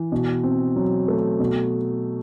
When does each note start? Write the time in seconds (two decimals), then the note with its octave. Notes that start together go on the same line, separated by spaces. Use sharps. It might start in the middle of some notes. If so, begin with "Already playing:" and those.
Already playing: E3
0.12 B2
0.43 C4
0.76 F#3
1.08 A3
1.40 B2